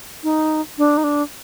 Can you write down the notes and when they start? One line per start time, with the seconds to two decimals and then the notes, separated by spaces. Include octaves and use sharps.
0.23 D#4
0.78 D4
0.98 D#4
1.04 D4